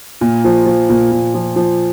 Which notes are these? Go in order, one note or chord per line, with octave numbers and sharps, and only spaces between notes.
A#2
F3
F3
A#2
A#2
F3
F3